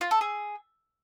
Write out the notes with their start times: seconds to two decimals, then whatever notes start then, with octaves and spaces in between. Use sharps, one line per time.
0.01 F4
0.11 A4
0.21 G#4